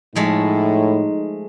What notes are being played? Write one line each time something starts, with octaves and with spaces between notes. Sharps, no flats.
A2 F3 G#3 A3 D#4